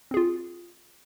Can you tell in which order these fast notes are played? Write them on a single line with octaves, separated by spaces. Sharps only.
C4 G#4 F4